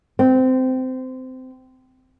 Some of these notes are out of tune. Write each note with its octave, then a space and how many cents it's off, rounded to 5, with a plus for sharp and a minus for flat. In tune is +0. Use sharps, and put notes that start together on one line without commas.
C4 -20